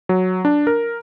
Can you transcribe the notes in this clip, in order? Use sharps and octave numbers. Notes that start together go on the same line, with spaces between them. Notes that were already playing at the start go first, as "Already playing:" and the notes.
F#3
D4
A#4